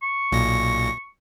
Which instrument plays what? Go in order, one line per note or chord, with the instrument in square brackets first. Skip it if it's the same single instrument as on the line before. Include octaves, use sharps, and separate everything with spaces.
[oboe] C#6
[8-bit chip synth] B1 A#2 A#6